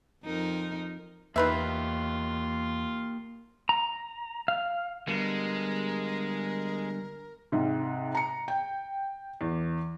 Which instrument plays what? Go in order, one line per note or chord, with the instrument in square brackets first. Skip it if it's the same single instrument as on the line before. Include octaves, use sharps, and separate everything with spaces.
[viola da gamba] F2 D#4 A#4
[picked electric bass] E2 [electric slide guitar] A#3 G4 [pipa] D#4 B4 E5 [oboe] F4
[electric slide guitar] A#5
F5
[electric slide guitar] D3 G3 B3 [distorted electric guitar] G#3 [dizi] A#4
[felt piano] G#2 C3
A#5 C#7
G5
E2